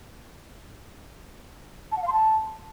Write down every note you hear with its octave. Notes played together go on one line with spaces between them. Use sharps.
A5
F#5
F5
C6
A5